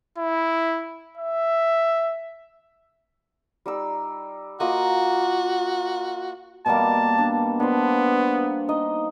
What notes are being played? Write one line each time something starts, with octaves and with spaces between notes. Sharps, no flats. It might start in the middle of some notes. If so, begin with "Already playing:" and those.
E4
E5
G3 D#4 E6
A#3 F4 F#4 D#5
B2 G3 A#3 A5
D4
B3 D4 C5
D#4 D#5